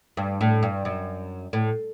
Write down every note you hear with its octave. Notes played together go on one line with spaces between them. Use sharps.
G2
A2
G2
F#2
A2